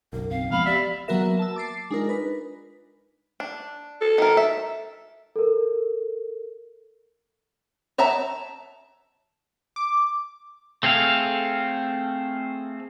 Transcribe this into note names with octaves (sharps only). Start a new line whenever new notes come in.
F#1 B1 A#4
C4 F5
F3 G#3 B3 F5 B5
G4 D5 E5
F#3 A#3 B3 F#4 A#4 E5
A5 E6
D6 A6 C7
G#3 D4 D#4 F4 A#4
B4
D4
A4
D#3 A#4
E5
A4 A#4
C#5 E5 A5 A#5
D6
A3 C4 G#4 A4 F5